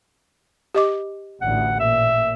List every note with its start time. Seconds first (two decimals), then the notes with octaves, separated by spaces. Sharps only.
0.75 G4 D#5 D6
1.42 A1 D2 F#5
1.80 A#2 E5